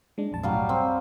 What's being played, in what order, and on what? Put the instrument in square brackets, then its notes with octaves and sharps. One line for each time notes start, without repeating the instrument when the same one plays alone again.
[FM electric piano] G#3 D4
A#1 F2 A5
[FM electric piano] B1 F#2 A2 [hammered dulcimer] F#3 G3 F5
[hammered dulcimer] C4